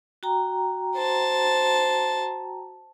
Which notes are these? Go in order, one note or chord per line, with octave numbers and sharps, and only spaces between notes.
F#4 G5 A#5
C5 A5